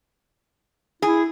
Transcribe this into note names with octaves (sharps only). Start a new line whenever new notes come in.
E4 G#4